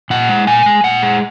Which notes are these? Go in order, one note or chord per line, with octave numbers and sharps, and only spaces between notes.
A#2 F#5
G#3
A#2 G#5
G#3
A#2 F#5
G#3